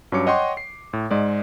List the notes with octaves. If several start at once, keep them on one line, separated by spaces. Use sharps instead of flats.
G2 F#3 C#4 C#5 D6 C#7
C#5 D#5 F#5 G5 C6 C#6
C7
A2
G#2 G#3 D5 D#5